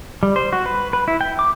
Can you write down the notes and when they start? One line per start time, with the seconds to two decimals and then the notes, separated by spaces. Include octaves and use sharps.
0.23 G3
0.36 C5
0.53 F#4
0.66 B4
0.93 B4
1.08 E4
1.21 G5
1.39 D6